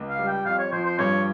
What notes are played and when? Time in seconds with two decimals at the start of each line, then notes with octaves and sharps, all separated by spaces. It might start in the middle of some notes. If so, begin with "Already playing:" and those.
Already playing: C#2
0.09 F5
0.18 G3
0.27 G5
0.45 F2 F5
0.59 C#5
0.72 F3 C5
0.85 C5
0.99 G2 C#5